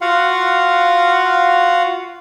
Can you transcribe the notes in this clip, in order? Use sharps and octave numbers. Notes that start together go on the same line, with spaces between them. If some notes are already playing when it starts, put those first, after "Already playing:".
F4 F#4 F5 F#5